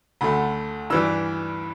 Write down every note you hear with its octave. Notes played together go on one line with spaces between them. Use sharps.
D2 D3 A3 B5
G2 E3 G3 E6